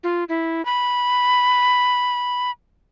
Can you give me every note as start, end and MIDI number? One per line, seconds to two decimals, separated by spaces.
0.03 0.24 65
0.29 0.64 64
0.65 2.51 83